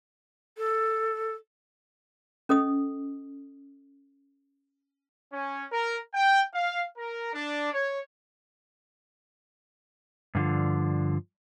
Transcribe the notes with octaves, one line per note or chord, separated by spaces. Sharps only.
A4
C#4 A4 D#5 D#6
C#4
A#4
G5
F5
A#4
D4
C#5
G2 D3 F3